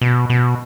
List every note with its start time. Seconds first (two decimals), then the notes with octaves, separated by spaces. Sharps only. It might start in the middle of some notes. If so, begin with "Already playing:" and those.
0.01 B2
0.30 B2